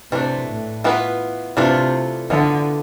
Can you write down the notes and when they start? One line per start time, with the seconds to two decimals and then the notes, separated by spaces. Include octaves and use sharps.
0.12 C3 E3 A3 D4
0.48 A2
0.84 E3 B3 F4 B4
1.57 C3 E3 A3 D4 F4
2.30 D3 E3 B3 F4 A4